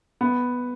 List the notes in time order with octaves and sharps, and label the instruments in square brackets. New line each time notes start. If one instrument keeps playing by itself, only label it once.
[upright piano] B3